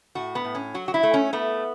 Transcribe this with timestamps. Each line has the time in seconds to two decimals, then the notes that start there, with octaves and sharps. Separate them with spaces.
0.15 A2 F#4
0.35 B3
0.45 A2
0.55 C#4
0.74 F#3 F#4
0.88 F#4
0.94 E4
1.03 A3
1.14 C#4
1.33 A3 B3